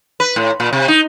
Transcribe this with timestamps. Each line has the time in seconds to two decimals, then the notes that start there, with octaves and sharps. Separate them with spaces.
0.20 B4
0.36 A2
0.60 A#2
0.73 C3
0.88 D#4